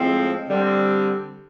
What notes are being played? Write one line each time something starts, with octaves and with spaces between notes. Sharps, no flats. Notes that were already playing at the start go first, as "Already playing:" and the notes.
Already playing: A2 F3 G#3 C4
D3 G3 C4